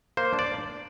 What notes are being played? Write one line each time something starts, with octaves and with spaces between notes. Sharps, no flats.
A#3 C5
D4
D5